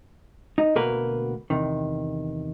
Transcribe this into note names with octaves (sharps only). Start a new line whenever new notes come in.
D#4
D2 B2 A#3 A#4 B4
E2 C3 D#3